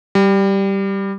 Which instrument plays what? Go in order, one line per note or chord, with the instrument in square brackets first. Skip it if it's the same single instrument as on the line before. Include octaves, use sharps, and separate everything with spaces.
[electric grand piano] G3